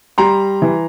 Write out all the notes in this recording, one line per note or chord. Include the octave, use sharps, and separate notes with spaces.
G3 A#5 C6
E3